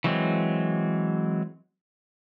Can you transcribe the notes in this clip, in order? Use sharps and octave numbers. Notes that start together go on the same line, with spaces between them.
E3 F#3 G#3 C4